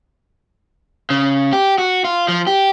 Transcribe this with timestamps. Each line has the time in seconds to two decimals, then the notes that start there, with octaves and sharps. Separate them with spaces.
1.10 C#3
1.53 G4
1.78 F#4
2.05 F4
2.28 F3
2.47 G4